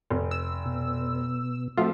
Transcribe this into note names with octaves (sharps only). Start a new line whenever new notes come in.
F1
E6
B2
F3 A3 C4 F4 F#4 E5